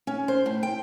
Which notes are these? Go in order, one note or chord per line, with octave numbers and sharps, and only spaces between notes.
C#4
C5
A2
G5